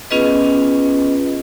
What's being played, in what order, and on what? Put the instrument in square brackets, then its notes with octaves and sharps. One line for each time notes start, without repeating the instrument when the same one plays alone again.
[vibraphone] B3 C#4 F4 G#4 B4 D#5